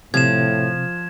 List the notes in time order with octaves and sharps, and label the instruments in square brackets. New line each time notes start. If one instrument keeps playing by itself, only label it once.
[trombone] A2 [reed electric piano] C3 [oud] F3 [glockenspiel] G#6 E7